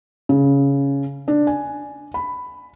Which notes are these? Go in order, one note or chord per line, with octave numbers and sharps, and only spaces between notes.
C#3
D4
G#5
B5